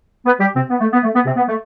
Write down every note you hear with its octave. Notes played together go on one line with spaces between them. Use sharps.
B3 B4
G3 G4
C3 C4
B3
A3
B3
A3
B3
C3 C4
B3
A3